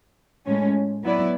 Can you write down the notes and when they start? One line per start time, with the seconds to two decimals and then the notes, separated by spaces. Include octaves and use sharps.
0.46 A2 G#3 C#4
1.03 F#3 B3 E4 B4 D5